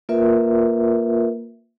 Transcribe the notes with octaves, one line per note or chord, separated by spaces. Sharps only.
A#3 F4 A#4 B4 E5